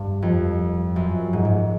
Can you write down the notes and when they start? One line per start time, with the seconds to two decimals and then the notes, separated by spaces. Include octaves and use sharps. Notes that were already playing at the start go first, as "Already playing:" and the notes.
Already playing: G2
0.22 F2
0.96 F#2
1.33 G#2
1.45 G#2